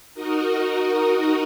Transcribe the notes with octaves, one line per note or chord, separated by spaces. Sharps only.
D#4 F#4 A#4 D#5